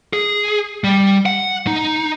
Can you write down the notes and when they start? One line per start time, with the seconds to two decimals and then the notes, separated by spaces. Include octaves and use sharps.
0.13 G#4
0.84 G3
1.26 F#5
1.67 D#4